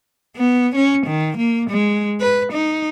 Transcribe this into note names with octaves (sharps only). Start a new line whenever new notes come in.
B3
C#4
D#3
A#3
G#3
B4
D#4